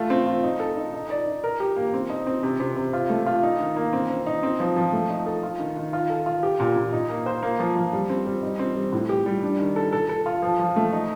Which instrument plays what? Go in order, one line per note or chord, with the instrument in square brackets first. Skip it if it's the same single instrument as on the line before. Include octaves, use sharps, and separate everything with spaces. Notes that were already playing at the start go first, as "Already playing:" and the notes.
Already playing: [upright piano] A3 F4
C4
F4
D#4
A4
D#4
D#4
D5
D#4
A#4
G4
A#3
C4
D#4
C4
C3
C3
C3
F4
A3
F4
D#4
D#3
A#3
C4
C4
D#4
C4
F3
F3
A3
D#4
A4
F4
D#3
D#3
F4
A4
F4
G4
A#2
A#2
D#4
A#3
C5
A#3
F3
F3
G3
C4
G3
D#4
C4
G3
A2
G4
G3
D4
D#3
A4
A4
A4
F4
F3
F3
A3
D#4